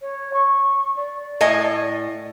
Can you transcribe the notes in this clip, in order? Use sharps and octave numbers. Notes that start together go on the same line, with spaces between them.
C#5
C#6
D5
A2 D#5 G#5